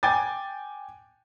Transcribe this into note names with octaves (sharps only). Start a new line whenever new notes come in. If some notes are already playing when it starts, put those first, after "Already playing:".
G5 G#5 D6 A6